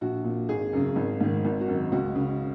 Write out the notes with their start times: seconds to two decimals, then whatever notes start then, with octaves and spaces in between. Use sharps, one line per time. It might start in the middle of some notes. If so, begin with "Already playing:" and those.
0.01 A#1 F#4
0.24 A#2
0.49 G#1 G#4
0.73 F#2 C#3
0.96 G#1
1.21 G#2 D#3
1.45 G#1
1.61 F#4
1.68 F#2 D#3
1.92 C#2 F#4
2.15 C#3